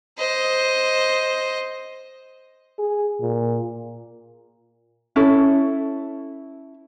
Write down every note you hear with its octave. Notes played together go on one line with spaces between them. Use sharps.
C5 D#5
G#4
A#2
C#4 E4 A4